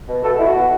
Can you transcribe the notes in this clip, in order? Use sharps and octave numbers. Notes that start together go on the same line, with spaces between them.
B2
B2 A4
A3 E4
F#4
B2